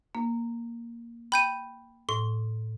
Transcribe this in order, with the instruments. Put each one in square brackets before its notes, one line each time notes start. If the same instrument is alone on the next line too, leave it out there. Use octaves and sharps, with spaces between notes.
[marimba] A#3
[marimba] G5 [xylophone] B5 G6 D#7
[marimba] A2 [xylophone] C6